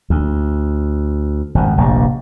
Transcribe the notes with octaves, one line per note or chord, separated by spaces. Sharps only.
D2
G#1 F2
F1 A#1 G2